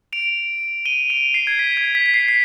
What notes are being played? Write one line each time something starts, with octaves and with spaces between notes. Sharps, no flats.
D7 F7
D#7 G7
D7 F7
C7
G#6
B6
G#6
B6
B6
C7
B6